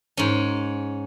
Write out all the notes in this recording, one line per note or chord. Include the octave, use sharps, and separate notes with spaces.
G#2 C#4